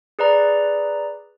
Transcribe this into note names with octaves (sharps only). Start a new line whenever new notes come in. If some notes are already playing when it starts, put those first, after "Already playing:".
G#4 B4 D5 A#5